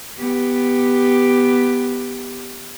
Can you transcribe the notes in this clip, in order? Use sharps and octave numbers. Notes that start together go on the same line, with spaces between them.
B3 G4